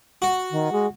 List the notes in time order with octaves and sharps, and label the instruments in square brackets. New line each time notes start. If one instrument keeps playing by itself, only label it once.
[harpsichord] F#4
[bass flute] D#3
G#3